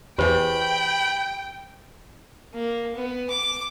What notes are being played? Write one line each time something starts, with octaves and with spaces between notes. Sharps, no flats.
E2 E3 G4 C5 G5 B5
A#3
B3
D6